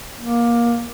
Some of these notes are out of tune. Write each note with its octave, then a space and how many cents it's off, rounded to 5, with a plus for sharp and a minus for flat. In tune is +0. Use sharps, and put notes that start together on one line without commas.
A#3 +20